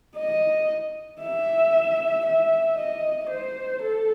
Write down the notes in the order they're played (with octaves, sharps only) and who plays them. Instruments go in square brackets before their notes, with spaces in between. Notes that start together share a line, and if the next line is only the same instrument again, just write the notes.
[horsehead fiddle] D#5
E5
E5
D#5
C5
A4